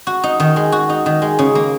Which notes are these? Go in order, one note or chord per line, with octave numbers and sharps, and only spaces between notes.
F#4
D#4
D#3
G#3
F#4
D#4
D#3
G#3
C#3
A#3